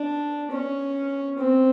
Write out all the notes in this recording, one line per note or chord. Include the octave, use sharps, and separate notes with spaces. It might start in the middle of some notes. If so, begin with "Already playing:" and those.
Already playing: D4
C#4
C4